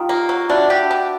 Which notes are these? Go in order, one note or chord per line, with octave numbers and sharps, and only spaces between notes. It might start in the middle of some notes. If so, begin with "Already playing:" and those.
Already playing: D#3 F4 G4
A#3
F#3
D4 E4 F#4
G4
D4